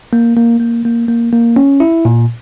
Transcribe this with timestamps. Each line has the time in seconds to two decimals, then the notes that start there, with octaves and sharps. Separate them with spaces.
0.13 A#3
0.37 A#3
0.60 A#3
0.85 A#3
1.08 A#3
1.33 A#3
1.56 C#4
1.80 E4
2.05 A#2